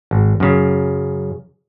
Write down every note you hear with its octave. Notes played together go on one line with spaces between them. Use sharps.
G#1
F#2 C#3